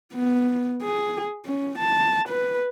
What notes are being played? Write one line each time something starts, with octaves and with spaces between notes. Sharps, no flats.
B3
G#4
C#4
A5
B4